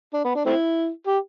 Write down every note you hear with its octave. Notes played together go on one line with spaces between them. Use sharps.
D4
B3
D4
A3 C4 E4
G4